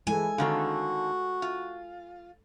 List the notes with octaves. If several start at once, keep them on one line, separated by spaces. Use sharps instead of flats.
E3 G#3 E4 A4 G#5
D3 D#3 C4 F#4 A4 F5
F4